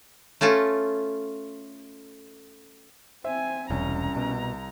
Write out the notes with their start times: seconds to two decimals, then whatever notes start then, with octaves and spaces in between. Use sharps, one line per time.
0.41 A3 C#4 F4 A4
3.24 C4 C5 E5 G#5
3.70 E1 C2 C#4 A#5
4.16 B2